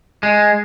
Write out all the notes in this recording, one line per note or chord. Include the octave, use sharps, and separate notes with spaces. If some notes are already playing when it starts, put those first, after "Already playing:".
G#3